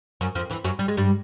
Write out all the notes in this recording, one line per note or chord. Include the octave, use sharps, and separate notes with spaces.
F#2 F#3
F2 F3
E2 E3
F#2 F#3
G3
G#3
G2 G3